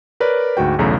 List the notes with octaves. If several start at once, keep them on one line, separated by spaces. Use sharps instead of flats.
A#4 B4 C#5 D5
D2 G#2 F#4 G5
B1 E2 C#3 A3 A#5